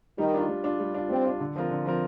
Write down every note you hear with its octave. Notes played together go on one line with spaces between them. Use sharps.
D#3 G3
D4 F4
G3
D4 F4
G3
D4 F4
G3 C4
D4 F4
D3
F3 C4 F4 A#4
D3
F3 C4 F4 A#4